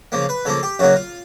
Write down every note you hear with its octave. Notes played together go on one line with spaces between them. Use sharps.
C#3 F3 A#3
B4
C#3 F3 A#3 A4
G4
F#2 C#3 F#3 A#3 F#4
F4